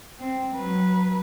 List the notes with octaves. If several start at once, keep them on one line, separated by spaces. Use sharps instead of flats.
C4
F#3 B4